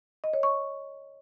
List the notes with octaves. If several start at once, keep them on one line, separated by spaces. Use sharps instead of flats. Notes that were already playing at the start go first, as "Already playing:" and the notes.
D#5
C#5
C#6